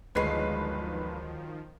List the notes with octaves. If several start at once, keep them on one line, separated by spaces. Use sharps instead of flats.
G1 D2 D#3 F3 F#3 G#3 B4 C7